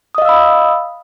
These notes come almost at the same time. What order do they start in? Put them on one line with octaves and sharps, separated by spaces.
D#6 D#5 F5 E6 B5